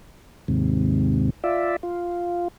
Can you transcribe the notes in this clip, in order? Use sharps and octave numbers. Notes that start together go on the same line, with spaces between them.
D#2 G#2 C3
F4 D5 E5
F4